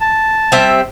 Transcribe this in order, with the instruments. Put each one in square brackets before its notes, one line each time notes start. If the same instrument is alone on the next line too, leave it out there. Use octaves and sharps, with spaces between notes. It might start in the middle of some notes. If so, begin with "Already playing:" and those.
[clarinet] A5
[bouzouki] G3 C4 E5